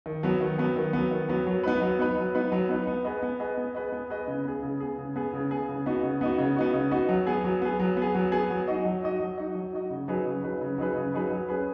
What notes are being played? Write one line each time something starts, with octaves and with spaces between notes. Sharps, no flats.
D#3
F#3 B3
D#3
F#3 B3
D#3
F#3 B3
D#3
F#3 B3
F#3
B3 D#4 B4
F#3
B3 D#4 B4
F#3
B3 D#4 B4
F#3
B3 D#4 B4
B3
G#4 B4 D#5
B3
G#4 B4 D#5
B3
G#4 B4 D#5
B3
G#4 B4 D#5
C#3
B3 G#4
C#3
B3 G#4
C#3
B3 G#4
C#3
B3 G#4
C#3
B3 D#4 F#4
C#3
B3 D#4 F#4
C#3
B3 D#4 F#4
C#3
B3 D#4 F#4
F#3
B3 G#4
F#3
B3 G#4
F#3
B3
G#4
F#3
B3 G#4
F#3
D#4 F#4 D#5
F#3
D#4 F#4 D#5
F#3
D#4 F#4 D#5
F#3
D#4 F#4 D#5
C#3
F#3 D#4 G#4 B4
C#3
F#3 D#4 G#4 B4
C#3
F#3 D#4 G#4 B4
C#3
F#3 D#4 G#4 B4
F#3
C#4 G#4 B4